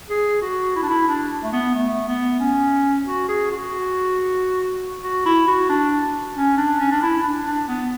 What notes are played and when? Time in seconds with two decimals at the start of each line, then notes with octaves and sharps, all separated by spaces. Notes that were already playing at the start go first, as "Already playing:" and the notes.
0.10 G#4
0.42 F#4
0.76 E4
0.82 D4
0.89 E4
1.08 D4
1.43 A3
1.53 B3
1.74 A3
2.07 B3
2.40 C#4
3.06 F#4
3.28 G#4
3.50 F#4
5.03 F#4
5.25 E4
5.48 F#4
5.69 D4
6.36 C#4
6.57 D4
6.80 C#4
6.91 D4
7.02 E4
7.23 D4
7.46 D4
7.68 B3